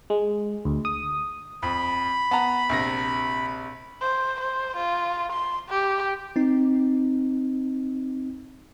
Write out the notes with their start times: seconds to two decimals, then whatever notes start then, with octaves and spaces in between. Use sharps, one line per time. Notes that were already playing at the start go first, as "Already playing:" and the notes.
0.10 G#3
0.65 D2
0.85 D#6
1.63 F2 B5
2.31 B3 A5 A#5
2.69 A#1 C3 A#6
4.02 C5
4.40 C5
4.76 F4
5.32 C6
5.70 G4
6.36 C4 D#4